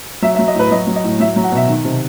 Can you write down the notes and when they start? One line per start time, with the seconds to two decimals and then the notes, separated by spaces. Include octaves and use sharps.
0.22 F#3 E5
0.35 E5
0.39 F#3
0.48 D#5
0.55 A2 B4
0.71 F#3 D#5
0.87 F#3
0.96 D#5
1.04 A2
1.20 F#3 E5
1.36 F#3
1.44 F#5
1.52 B2 E5
1.68 D#3
1.85 C3